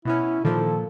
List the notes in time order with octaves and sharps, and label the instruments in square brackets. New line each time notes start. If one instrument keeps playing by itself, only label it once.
[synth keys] B2 B3 C#4 [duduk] E4
[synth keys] A#2 F3 [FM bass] D#3 [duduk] A4